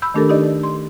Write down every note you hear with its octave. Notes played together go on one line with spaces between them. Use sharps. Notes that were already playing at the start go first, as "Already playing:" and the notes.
B5 E6 G6
D#3 A3 D4 G4 A4 A#4
D#4 G4 D5 D#5
C6